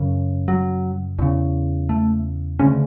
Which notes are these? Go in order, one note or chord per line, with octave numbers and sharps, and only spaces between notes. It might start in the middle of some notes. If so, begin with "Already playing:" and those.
Already playing: F#2 C#3
F#3
E2 C#3
A3
D2 C#3 C#4